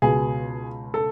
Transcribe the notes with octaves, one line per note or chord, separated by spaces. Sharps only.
C#2 B2 G#4
A4